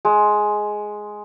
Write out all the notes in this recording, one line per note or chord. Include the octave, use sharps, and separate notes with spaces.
G#3